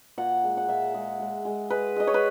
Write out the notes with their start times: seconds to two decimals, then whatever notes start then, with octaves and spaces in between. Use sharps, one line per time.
0.18 A#2 F#5
0.44 G#3
0.57 F#5
0.69 A#2 E5
0.94 G#3
1.20 G#3
1.45 G#3
1.70 G#3 B4
1.96 G#3 D#5
2.07 C#5
2.14 B4